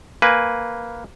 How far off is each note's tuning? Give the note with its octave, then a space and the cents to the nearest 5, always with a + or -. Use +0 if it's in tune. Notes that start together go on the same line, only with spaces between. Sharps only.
A#3 +0 B4 +0 G#5 +0